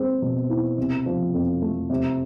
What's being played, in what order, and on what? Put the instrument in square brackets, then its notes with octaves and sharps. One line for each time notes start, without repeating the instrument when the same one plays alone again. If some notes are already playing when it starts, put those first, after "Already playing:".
Already playing: [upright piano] G#3 C4
B2
E4
C3
F3
F2
A3
C3